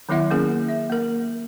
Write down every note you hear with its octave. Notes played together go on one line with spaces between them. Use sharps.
D#3 F#3 B3 E4 E5 F#5
A#3 C#4 G#4 A#4
E5
A#3 A#4